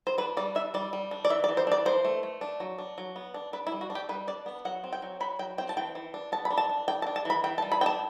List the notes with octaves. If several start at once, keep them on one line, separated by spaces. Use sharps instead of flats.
C5
D4 B4
G3 D5
D4 E5
G3 D5
G3
D4
D5
E3 E5
D5
E3
C5
D4 D5
E3 C5
A3
A3
D4
F#3
D4
F#3
B3
D4
D4 B4
E4
G3
F#4
D4
G4
G3 B4
D4 D5
B3
F#3 F#5
C4
G5
F#3
F#3 B5
F#3 G5
C4 G5
A5
E3 G5
E3
D4
B3 A5
B5
D4
A5
D4
D4 G5
A5
D4
A5
E3 B5
E3 G5
A5
G3
B5
D4 G5 A5